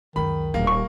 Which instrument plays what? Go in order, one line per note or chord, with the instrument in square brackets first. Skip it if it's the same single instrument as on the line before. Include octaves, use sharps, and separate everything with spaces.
[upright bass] C#2 F#2 [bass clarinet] D#3 [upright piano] B5
[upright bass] D#1 G3 [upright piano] A#3
[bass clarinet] D#2 [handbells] C#6